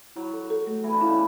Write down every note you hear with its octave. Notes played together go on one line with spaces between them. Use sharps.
F#3 E4
A4
A4
A3
E3 A3
D3
C#3 E4
B2